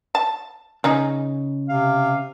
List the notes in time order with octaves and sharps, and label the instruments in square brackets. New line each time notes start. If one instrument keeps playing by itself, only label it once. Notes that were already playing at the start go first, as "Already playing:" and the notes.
[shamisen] A5
[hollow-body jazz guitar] C#3 [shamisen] C#4 D#4 G#4
[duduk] C3 [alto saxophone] F5